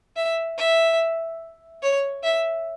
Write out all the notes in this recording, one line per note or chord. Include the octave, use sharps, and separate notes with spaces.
E5
E5
C#5
E5